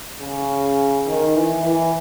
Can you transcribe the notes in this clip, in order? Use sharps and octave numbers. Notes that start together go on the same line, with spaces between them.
C#3
D#3
E3
E3